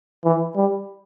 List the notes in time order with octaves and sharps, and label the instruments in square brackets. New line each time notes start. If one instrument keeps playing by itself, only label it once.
[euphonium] E3
G3